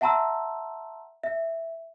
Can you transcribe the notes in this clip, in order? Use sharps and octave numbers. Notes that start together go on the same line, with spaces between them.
E5 F#5 A5 A#5 C6 E6
E5